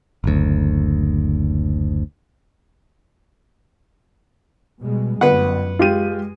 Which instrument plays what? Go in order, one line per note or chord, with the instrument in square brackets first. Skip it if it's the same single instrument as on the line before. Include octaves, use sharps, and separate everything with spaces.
[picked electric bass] F#1 D2
[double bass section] B2 G3 G#3
[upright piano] G1 [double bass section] F#2 [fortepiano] B4 F#5
[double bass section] G#3 [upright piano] F4 G4 D#7